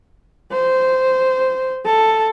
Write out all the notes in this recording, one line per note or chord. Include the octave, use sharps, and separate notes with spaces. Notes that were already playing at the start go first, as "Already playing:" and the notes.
C5
A4